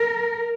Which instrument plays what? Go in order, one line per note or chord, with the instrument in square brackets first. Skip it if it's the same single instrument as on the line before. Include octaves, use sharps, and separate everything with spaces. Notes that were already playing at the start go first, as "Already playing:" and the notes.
Already playing: [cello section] A#4